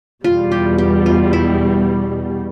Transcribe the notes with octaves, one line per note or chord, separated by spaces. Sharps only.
E2 B2 G3 F4
G4
G4
F4
E4